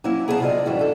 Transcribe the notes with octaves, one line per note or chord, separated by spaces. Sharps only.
F#3 A#3 C#4 E4
B3 G#4 C5 C#5 F5 A5
C3 F#3 E4 F4 D5 D#5
F#2 A2 E3 G3 E4 F#4
D4 A4